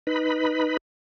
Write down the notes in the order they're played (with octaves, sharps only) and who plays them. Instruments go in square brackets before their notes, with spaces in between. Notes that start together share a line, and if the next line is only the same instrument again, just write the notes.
[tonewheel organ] D#4 B4 B5